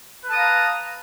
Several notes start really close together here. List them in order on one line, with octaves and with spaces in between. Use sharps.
B4 A5 D#6 F5 A#5